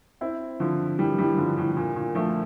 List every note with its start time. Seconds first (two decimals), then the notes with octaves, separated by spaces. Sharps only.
0.21 C4 E4
0.60 D3 F3
0.99 E3 G3
1.18 E3 G3
1.38 D3 F3
1.58 A2
1.77 A#2
1.96 A#2
2.15 F3 A3